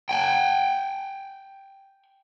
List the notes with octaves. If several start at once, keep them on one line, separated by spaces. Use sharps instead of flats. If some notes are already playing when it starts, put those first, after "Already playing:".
G5 G#5